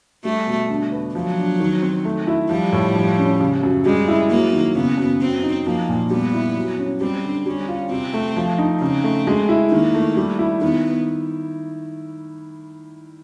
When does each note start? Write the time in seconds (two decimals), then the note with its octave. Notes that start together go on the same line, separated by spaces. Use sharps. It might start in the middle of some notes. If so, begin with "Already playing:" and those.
0.25 G3 A3
0.47 B2
0.70 D3
0.92 B3
1.14 F3 F#3
1.37 D4
1.60 D#3
1.82 C4
2.05 A3
2.27 E4
2.50 F3 G3
2.72 A2
2.96 F3
3.18 C#4
3.40 C#3
3.63 F#2
3.85 G3 G#3
4.08 E4
4.30 F#3 A#3
4.53 D#3
4.75 C#3 B3
4.98 F#2
5.20 F#3 C4
5.43 D#4
5.66 F3 A#3
5.89 A#2
6.10 G3 B3
6.34 E4
6.56 F#3
6.79 C#4
7.01 G3 C4
7.24 D3
7.46 G3 C#4
7.68 F4
7.91 C3 C4
8.14 A3
8.36 F3
8.58 D#4
8.81 C#3 C4
9.04 A3
9.27 G#3
9.49 E4
9.72 D#3 A#3
9.94 A3
10.16 G3
10.39 E4
10.62 D#3 B3